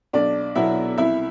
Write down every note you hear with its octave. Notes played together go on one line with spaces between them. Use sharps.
B1 D4 D5
B2 F#3 B3 E4 E5
C2 E4 E5